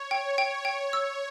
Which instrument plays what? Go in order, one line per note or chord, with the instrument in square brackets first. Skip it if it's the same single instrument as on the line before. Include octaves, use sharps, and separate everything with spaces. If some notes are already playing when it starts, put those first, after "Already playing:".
Already playing: [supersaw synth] C#5
[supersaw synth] C#5 [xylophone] G5
[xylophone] G5
G5
E6